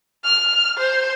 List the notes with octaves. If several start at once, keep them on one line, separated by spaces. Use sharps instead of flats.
F6
C5